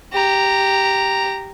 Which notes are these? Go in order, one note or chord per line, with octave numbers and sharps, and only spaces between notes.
G4 A#5